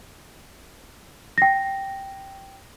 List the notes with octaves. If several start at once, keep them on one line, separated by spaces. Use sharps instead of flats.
G5 A#6